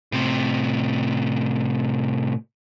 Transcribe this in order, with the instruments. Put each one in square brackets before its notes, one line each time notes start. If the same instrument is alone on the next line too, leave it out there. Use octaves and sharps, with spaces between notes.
[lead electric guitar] A2 C3